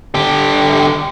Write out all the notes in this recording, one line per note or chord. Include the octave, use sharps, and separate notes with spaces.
D3 G4